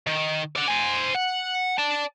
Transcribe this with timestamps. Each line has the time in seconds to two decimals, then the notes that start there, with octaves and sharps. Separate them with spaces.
0.07 D#3
0.56 D5 F#5
0.68 C5 G#5
1.15 F#5
1.79 D5 A5